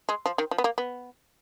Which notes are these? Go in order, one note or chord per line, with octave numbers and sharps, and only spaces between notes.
G#3
F3
D#3
F3
B3
A#3
B3